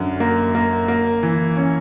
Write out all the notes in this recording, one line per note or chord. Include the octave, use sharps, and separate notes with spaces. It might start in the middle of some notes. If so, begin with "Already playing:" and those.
Already playing: F#2 D3
A#3
A#3
A#3
E3
C#4